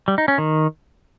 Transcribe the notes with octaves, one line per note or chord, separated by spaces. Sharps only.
G3
D#4
C#4
D#3